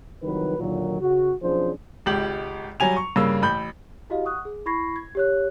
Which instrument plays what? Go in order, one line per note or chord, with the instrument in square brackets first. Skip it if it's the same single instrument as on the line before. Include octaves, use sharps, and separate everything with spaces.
[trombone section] C2 D#3 F3 F#3 B4
D#2 A#2 D3 D#3 F#3
C#3 F#4
B1 F3 C#4 D4 G#4 C5
[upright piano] G#1 C#2 G4 F#7
F#3 G3 G#5 F7
C#6
G2 C#3 A#3 E6
A1 B5 G6
[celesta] E4 F#4 G4 D#5 F5
F#5 C#6 D#6 F#6
G#4
E4 B5 C#6 G#6 A#6 C7
G#6
G4 C#5 F#6